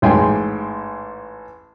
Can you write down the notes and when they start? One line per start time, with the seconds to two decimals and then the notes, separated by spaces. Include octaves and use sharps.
0.02 A1 G#2 G5 G#5 C6